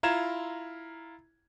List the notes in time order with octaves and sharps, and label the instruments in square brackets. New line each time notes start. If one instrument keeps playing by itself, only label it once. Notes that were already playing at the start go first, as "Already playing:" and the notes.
[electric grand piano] E4 F4 A#5 G#6 E7